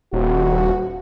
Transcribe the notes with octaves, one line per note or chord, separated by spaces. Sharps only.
D#1 F#4